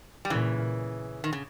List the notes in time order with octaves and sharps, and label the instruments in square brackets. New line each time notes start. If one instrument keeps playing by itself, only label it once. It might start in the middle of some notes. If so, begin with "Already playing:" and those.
[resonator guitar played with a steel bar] G3
[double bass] A#2 [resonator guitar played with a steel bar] C#3 E3
[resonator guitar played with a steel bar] D#3
C#3